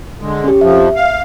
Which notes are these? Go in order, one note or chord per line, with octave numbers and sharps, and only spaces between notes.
D3 G#3
C#4 G4
F2 F3 E5
F5